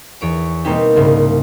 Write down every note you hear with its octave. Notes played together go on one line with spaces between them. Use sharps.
E2 C#5 D7
B2 G3 A#3 C4 D#4 G4
C2 G#2 C#3